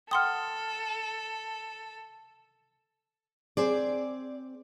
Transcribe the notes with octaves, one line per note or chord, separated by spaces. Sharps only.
A4 F#5 G5 C6 D#6 F6
C4 G#4 C5 D5